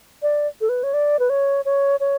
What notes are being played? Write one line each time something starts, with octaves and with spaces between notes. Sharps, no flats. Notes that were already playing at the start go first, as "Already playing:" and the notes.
D5
A4
B4
C#5
D5
B4
C#5
C#5
C#5